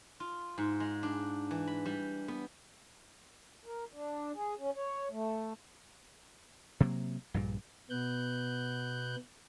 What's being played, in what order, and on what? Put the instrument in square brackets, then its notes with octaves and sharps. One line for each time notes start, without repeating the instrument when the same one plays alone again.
[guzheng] F4
G#2
G#3
D4
E3
B5
G3
B3
[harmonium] A#4
D4
G#4
C#4
C#5
A3
[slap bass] C3 F#3 A#3
A#1 G2 A#2
[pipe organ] B2 B3 F#6 G6